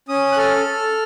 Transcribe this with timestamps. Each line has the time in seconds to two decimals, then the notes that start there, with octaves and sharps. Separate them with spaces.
0.09 C#4 D#6
0.32 F#6
0.37 A4 F6
0.65 A4